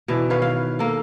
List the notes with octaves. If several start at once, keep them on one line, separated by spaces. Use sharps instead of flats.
B2 E3 D5
D#3 B4 C#5 F5
F5
A#3 A4